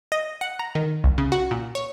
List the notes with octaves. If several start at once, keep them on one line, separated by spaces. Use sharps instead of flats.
D#5
F#5
A#5
D#3
C2
C#3
F#4
A#2
C#5